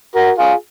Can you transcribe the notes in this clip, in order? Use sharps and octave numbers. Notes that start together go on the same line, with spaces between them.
F#4 A#4
F4 G#4